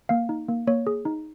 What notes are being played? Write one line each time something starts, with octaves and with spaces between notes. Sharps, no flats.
A#3 F5
D#4
A#3
A#3 C#5
G#4
D#4